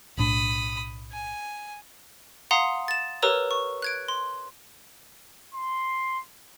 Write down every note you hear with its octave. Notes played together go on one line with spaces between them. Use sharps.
B1 A2 D4 B5 D#6
G#5
F5 F#5 A#5 C6 D#6
A6 E7
G4 A#4 B4 C#5 A#5 E6
C#6
F#6 G#6 D7
C6
C6